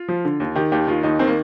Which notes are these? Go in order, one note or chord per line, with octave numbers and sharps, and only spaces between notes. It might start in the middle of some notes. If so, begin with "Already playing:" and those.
Already playing: F4
F3
D3
D#2
D#3 G4
D#2 G4
D#3 F4
D#2 D#4
D#3 C4
A#3